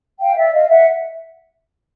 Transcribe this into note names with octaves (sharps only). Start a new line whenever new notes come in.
F5 G5
D5 E5
D#5 F5
E5 F#5